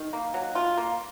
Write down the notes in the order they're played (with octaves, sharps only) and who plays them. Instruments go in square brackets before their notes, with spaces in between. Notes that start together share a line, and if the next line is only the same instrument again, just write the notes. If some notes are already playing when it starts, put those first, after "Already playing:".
Already playing: [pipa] D#3
A#3
F#3
F4
A#3